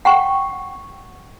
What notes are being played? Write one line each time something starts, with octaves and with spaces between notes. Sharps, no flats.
F#5 G5 C#6